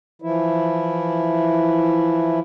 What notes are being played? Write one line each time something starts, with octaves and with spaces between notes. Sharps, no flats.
E3 F3 E4